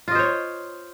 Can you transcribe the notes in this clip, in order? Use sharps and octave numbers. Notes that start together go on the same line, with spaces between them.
F4 C5 C#5 D#5